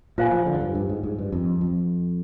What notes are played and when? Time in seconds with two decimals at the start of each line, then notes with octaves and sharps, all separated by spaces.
0.18 A#2 F4 C5 F5 G#5
0.31 F3
0.46 D3
0.55 G#2
0.60 G2
0.75 G2
0.89 G#2
1.03 G#2
1.18 G2
1.32 F2
1.61 F2